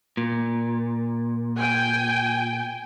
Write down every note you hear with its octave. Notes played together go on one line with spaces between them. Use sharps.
A#2
G5 G#5